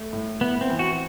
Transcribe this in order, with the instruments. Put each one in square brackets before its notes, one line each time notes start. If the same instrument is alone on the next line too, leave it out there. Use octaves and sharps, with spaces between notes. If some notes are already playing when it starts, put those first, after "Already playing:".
Already playing: [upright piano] A3
A2
[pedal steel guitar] B3 [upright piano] E4
[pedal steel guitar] C4
[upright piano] E3
[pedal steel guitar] F#4